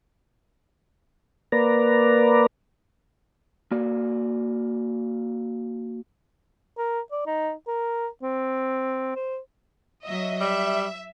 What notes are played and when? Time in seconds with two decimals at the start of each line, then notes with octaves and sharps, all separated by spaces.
1.52 A#3 B4 D5 A#5
3.71 A#3 F#4 D5
6.78 A#4
7.12 D5
7.26 D#4
7.67 A#4
8.23 C4
9.16 C5
10.04 F#3 D#5 E5
10.40 G3 E5